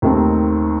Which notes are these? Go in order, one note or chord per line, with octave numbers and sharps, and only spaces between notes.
D#2 D#3 A3 C4